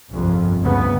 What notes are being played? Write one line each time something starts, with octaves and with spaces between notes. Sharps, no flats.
G1 C2 F2 F3
D2 G2 C#3 B3